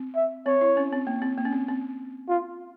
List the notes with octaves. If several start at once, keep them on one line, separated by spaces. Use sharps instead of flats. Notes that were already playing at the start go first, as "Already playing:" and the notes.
Already playing: C4
E5
C4 C#5
E4
C#4
C4
A#3
C4
A#3
C#4
C4
C4
F4